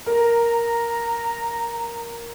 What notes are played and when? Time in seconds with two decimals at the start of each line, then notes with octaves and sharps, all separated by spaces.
0.06 A#4 A#5